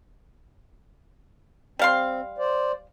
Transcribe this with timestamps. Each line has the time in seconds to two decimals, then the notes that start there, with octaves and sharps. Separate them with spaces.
1.79 G3 C4 F5 C6
2.38 C5 D5